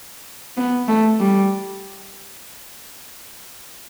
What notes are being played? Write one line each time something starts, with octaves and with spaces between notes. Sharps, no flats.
B3
A3
G3